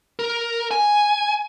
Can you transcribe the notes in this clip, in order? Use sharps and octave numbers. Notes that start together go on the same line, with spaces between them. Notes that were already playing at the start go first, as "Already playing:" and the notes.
A#4
G#5